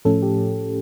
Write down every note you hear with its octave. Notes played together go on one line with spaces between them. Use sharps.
A2 F3 A3 C#4 A4
G4